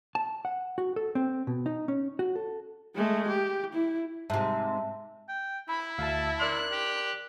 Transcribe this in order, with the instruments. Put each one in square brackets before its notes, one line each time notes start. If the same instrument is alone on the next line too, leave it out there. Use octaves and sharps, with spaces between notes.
[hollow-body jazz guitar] A5
F#5
F#4
A4
C4
B2
D#4
C#4
F#4
A4
[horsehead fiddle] G#3 A3
G4
E4
[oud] G#2 C3 [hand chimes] E5 A5
[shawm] G5
[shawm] E4 [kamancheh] B5
[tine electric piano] D2 F5 [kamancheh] E5 A5
[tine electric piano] A#4 D5 C6 [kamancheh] F#6
[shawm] G4